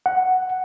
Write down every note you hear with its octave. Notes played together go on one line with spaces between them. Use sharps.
F#5